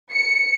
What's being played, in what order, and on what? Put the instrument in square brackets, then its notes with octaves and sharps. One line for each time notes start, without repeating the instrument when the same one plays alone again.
[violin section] C#7